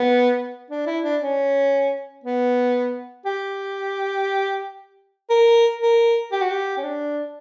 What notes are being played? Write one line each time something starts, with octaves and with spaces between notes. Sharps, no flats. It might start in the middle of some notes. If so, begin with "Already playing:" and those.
Already playing: B3
D4
E4
D4
C#4
B3
G4
A#4
A#4
G4
F#4
G4
C#4
D4